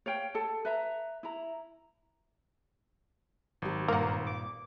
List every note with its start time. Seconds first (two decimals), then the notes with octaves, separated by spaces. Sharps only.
0.06 C#5 F5 G5
0.34 A4 A5
0.65 B4 E5 A#5
1.23 E4 A#5
3.62 G#1 F#3 G4
3.88 G2 A#2 A#3 A#4 F#5
4.27 D6